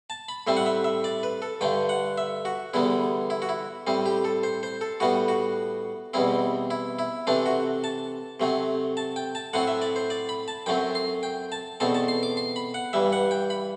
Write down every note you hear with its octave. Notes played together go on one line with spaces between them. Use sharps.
A5
B5
A2 G3 C4 E5
F#5
E5
E5
D5
B4
A4
G2 D3 A3 G5
F#5
E5
F#4
E2 D3 G3 B3 E4
E4
F#4
E4
A2 G3 C4
G4
A4
C5
C5
A4
A2 G3 B3 F#4
F#4
E2 B2 G3 C4 E4
E4
E4
C3 E3 A3 C4 D4
F#4
A5
C3 F#3 A3 C4
A5
G5
A5
A2 F#3 C4 F#5
E5
D5
C5
D5
B5
A5
F#2 F#3 A3 C4 G5
C6
G5
A5
E2 B2 A3 C4 A5
A5
C6
D6
C6
B5
F#5
G2 E3 G3 E5
F#5
G5
B5